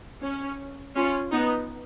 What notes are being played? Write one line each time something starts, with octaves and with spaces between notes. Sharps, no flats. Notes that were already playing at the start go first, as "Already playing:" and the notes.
C#4
C#4 F4
B3 D#4